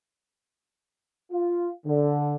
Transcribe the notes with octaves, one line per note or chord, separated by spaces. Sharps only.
F4
D3